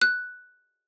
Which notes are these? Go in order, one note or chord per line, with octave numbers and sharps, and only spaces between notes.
F#6